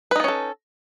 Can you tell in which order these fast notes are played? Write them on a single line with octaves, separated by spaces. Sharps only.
B4 D#4 B3 C#4 A4